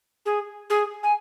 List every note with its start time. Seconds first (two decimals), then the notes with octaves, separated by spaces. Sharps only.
0.25 G#4
0.69 G#4
1.02 G#5